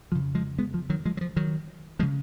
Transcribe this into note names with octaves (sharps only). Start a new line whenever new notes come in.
F2 C#3 F3
F3 G#3
G#3 B3
F3
D#3 F#3
F3 G#3
F#3
F3
D#3 F#3
F3 G#3
C#3